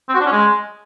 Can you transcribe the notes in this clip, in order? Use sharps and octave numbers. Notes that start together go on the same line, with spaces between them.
C4
F#4
D4
C#4
G#3